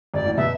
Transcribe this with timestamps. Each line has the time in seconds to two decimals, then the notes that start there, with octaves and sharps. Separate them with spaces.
0.14 G#1 G#2 D5
0.26 A1 A2
0.37 B2 E5